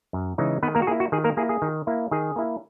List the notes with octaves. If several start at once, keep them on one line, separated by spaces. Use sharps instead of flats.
F#2
C#3 E3 G#3 D#4
D#3 B3 B4
A#3 A#4
F#4
A#3 E4 G#4
F#4
D#3 G#4
A#3 A#4
A#3 E4 G#4
G#4
D#3
A#3 E4
D#3 G#4
A#3 E4